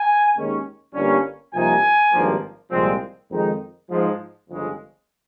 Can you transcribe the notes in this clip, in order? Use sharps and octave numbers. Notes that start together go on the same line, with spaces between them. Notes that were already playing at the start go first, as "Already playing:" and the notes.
Already playing: G#5
D#2 D#3 G#3 C#4
G1 G2 G3 A#3 C#4
C2 C3 F3 A#3 D#4 G#5
G#1 G2 F3 A#3
C2 A#2 F3 G#3 C4
F2 D#3 G#3 D#4
G#2 F3 G#3
G1 F2 C#3 G#3